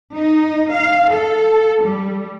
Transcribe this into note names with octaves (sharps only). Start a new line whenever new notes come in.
D#4
F5
A4
G3